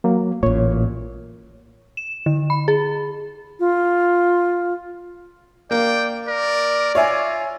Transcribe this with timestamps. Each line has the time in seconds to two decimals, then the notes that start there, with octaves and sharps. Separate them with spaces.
0.04 F#3 A#3
0.43 A1 A#2 C#5
1.97 E7
2.26 D3
2.50 B5
2.68 G#4
3.59 F4
5.71 A#3 D5 G5
6.28 A#4 D5
6.95 F4 C#5 E5 G#5